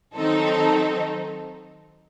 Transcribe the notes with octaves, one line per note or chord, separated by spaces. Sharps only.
D#3 F#3 C4 D#4 A4